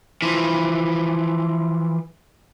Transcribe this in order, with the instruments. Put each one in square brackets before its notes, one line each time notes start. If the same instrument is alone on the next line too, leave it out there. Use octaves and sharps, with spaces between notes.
[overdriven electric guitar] E3 F3